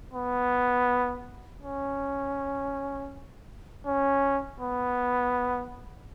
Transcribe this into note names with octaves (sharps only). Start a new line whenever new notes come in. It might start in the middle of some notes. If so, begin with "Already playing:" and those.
B3
C#4
C#4
B3